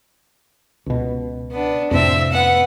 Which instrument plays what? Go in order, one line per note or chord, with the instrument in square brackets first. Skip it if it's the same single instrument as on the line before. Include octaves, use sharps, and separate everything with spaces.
[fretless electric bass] C#2 B2
[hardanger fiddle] B3 D4
[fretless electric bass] F2 A2 C3 [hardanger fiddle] C4 E5
[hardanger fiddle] B3 F#5